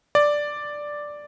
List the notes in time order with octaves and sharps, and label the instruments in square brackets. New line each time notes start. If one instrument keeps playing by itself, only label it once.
[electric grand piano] D5